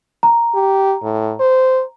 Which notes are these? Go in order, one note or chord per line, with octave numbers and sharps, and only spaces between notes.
A#5
G4
A2
C5